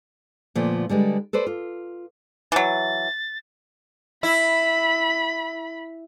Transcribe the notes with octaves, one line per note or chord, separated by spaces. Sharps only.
A#2 D3 F3 A3 B3
D3 G3 G#3 B4
A4 B4 C5 D5
F4
E3 F#3 A6
E4 B5